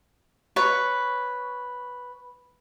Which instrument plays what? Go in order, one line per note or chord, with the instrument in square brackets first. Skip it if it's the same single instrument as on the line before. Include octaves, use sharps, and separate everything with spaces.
[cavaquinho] B4 C#5